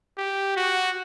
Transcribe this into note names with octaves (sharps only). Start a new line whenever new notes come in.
G4
F#4